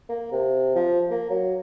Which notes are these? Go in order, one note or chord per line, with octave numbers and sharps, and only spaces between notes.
A#3
C3
F3
A#3
F#3